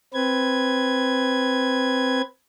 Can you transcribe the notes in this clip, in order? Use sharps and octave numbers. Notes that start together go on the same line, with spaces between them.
C4 B4 G#6